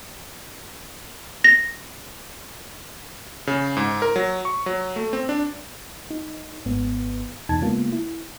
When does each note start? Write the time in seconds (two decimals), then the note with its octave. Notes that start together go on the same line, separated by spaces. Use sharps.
1.44 A#6
3.47 C#3
3.77 G#2
4.02 A#4
4.16 F#3
4.45 C#6
4.66 F#3
4.96 A3
5.13 C4
5.29 D4
6.11 D#4
6.66 G#1 G#2 B3
7.49 E2 B2 D#4 A5 G#6
7.61 C#3 G#3 A#3 B3 F4
7.92 E4